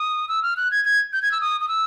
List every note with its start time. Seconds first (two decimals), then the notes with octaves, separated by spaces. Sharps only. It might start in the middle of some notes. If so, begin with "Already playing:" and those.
Already playing: D#6
0.28 E6
0.43 F6
0.57 F#6
0.71 G#6
0.85 G#6
1.13 G6
1.22 G#6
1.32 E6
1.41 D#6
1.61 D#6
1.68 E6